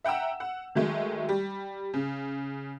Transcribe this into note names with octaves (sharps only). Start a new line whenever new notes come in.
E5 F#5 G5 A#5 E6
F#5
D#3 F#3 G#3 A3
G3
C#3